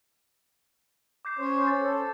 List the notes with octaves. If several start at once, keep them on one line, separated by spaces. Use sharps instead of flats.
D6 G6 C7
C#4 C5 C#5
A6
A4